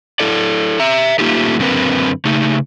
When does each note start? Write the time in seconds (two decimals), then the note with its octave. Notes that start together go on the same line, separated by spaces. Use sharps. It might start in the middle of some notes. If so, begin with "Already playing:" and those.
0.20 E4 A4 D5
0.80 E5 A#5
1.19 A3 A#3 D#4 F4 G4 G#4
1.59 F#2 D3 C4 A#4 B4
2.25 C#3 A3 D#4